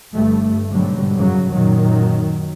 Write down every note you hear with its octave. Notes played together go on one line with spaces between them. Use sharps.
G1 G2 A3
G#2 B2 D3 F#3 G3
F#2 C#3 F#3
F#2 A#2 D#3 F#3